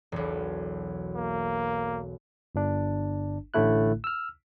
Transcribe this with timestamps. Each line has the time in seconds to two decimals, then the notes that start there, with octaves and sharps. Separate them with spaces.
0.12 E1 B1
1.15 A#3
2.55 G1 D4
3.54 A1 A2 D3 A3 E4 F#6
4.04 E6 F6